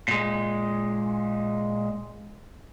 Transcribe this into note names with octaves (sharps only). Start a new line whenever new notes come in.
A#2 G#3